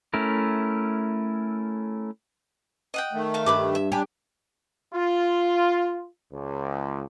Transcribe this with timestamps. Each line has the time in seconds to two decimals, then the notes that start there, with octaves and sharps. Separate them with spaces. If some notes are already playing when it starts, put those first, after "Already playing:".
0.14 A3 C#4 E4 A#4
2.94 D#5 F#5 G5
3.13 D#3 A3
3.34 A4 E5 F5
3.46 G2 B4 B5 D6
3.75 E5
3.92 D4 G4 G#5 B5
4.94 F4
6.33 C#2